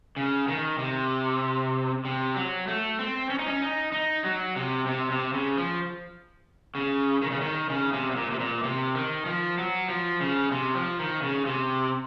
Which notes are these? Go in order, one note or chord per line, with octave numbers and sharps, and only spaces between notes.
C#3
D#3
C3
C3
F#3
A3
C4
C#4
D#4
C#4
D#4
D#4
F#3
C3
C3
C3
C#3
F3
C#3
D#3
C#3
D#3
C#3
C3
C3
A#2
C3
A#2
C3
D#3
F3
F#3
F3
C#3
C3
F3
D#3
C#3
C3